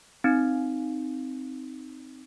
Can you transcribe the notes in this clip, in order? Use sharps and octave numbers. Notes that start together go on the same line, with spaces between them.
C4 D#4